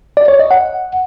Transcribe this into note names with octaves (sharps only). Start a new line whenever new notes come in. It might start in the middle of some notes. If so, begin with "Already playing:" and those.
D5
C#5
D#5
F#5